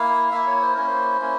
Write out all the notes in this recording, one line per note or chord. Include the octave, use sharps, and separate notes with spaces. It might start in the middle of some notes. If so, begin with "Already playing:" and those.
Already playing: A#3 E4 F5
A#3 E4 E5
C#5
C5
A#3 C#4 E4 A#4
C5
A#3 C#4 E4